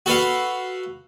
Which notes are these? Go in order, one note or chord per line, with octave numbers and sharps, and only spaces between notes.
F#4 A4 B4 F5